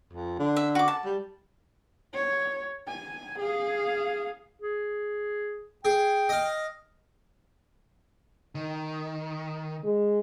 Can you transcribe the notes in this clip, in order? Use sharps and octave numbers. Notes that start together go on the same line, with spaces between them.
F2
D3
E5
F#4 D6
A5
G3
C#5
G#5
G#4 F5
G#4
G#4 G5
D#5 F5
D#3
G#3